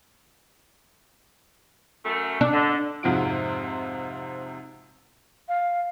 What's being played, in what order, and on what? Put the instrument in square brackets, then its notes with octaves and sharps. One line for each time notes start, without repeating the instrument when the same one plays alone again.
[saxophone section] F#2 A3
[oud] D4
[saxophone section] D3
[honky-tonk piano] F2 G#2 C3 F4 F#4 D7
[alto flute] F5